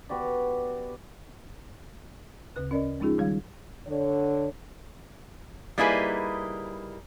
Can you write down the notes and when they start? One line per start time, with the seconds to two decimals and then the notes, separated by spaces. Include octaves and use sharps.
0.09 B3 F#4 G4 D5
2.56 D2 C#3 B4 F#6
2.71 C#4 A#4 D5 D#5
3.00 F3 G#3 C#4 D#4 F4 G#4
3.18 D#3 G3 F5 G#6
3.87 D3 C#5
5.78 G3 A#3 D#4 E4 G#4 B4